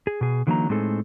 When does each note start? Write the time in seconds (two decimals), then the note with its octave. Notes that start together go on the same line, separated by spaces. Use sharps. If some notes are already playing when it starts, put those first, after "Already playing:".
0.07 G#4
0.21 B2 G#4
0.47 D3 E3 F#3 A#3 D#4 A#5
0.69 A2 G#3 C4 D#4 G#4 A4